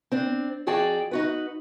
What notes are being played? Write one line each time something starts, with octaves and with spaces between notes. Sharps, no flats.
C4 D4
F2 F#4 G#4 D5 G5 A5
D#4 F#4 B4